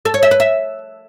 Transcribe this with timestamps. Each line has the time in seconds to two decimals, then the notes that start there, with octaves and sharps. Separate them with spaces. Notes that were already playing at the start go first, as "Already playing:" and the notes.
0.05 A4
0.14 C#5
0.23 E5
0.31 B4
0.40 E5